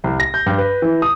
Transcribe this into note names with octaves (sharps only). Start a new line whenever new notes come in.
C2
A#6
G6
G2
B4
E3
D#6